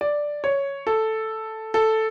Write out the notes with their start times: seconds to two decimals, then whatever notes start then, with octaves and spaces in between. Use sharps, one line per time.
0.01 D5
0.44 C#5
0.87 A4
1.74 A4